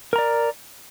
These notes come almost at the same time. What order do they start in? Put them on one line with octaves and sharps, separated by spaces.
A#4 A#5 D5